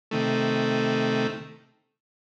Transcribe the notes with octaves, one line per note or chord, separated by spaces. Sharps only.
C3 D#3 A3